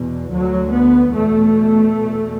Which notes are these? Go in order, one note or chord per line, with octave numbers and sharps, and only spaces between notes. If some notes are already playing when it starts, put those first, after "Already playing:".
Already playing: E2 B2
D2 F#3
B3
E2 B2 A3
E2 B2